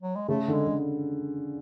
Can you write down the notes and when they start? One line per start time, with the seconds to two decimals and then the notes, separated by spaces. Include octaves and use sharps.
0.02 F#3
0.16 G#3
0.28 C#3 A3
0.48 D3
0.53 G#3
0.67 D3